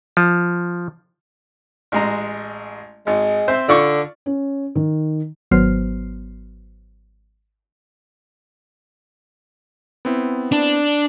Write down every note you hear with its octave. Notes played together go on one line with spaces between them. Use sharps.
F3
A1 G#3 A#5
G#1 G#3
C4 C5 E5
D3 F4 D5 C#6
C#4
D#3
G#1 F#3 B3 C5 F6 C7
B3 C4 E4
D4